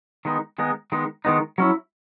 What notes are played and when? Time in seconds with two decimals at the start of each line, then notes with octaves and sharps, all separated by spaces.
0.25 D#3 G#3 B3 D#4
0.58 D#3 G#3 B3 D#4
0.92 D#3 G#3 B3 D#4
1.25 D#3 G#3 B3 D#4
1.58 F#3 C#4 E4